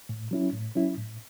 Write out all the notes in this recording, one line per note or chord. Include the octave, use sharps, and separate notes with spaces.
A2
F#3 C#4 E4
A2
F#3 C#4 E4
A2